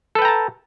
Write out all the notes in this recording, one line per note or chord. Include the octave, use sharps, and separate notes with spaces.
A4 B4 G5 A5 A#5